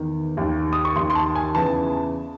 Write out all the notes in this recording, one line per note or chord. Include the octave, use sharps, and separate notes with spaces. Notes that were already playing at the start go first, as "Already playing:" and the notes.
Already playing: E2 D#3
D#2 D#3
D#6
C#6
D#2 D#3 C6
C6
A5
G#5
E2 C#3 E3 A5